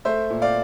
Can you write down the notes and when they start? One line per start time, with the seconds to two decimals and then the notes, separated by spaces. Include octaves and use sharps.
0.05 A3 C5 E5
0.30 A#2
0.42 D5 F5